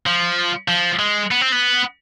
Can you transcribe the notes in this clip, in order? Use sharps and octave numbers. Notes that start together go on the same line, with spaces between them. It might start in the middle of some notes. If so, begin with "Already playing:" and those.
F3
F3
G#3
B3
C4
B3